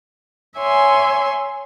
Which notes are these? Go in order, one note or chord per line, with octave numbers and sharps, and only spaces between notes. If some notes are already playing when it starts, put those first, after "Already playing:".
C#5 E5 G#5 C6